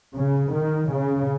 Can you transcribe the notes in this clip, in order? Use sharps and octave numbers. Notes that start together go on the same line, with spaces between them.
C#3
D#3
C#3